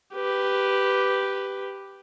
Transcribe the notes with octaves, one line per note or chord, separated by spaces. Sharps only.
G4 B4